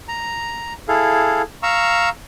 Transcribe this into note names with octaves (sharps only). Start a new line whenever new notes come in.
A#5
E4 G#4 A4 F5
F5 A#5 C#6 E6